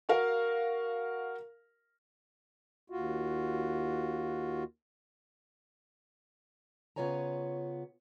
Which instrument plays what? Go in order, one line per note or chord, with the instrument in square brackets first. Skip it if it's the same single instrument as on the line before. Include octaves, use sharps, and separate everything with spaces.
[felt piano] F#4 A#4 F5
[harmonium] D#2 F4 F#4
[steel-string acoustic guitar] C#3 B3 F4 C#5 G#5 A#5